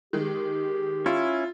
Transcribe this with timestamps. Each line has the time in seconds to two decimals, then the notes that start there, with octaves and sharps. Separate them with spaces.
0.13 D#3 G#3 G4
1.06 C#4 E4 F4